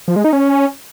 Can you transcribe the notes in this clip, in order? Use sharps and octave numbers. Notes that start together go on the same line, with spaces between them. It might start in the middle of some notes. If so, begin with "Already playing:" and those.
F3
G#3
D#4
C#4